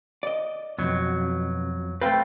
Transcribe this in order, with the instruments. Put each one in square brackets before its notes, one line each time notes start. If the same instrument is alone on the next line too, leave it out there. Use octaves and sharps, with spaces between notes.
[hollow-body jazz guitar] D5 D#5
[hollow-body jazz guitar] C2 B2 [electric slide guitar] F2 F#3
[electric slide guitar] A3 C4 [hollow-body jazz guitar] B4 F5 G5